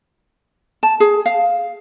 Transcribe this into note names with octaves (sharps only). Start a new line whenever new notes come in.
A5
G#4
F5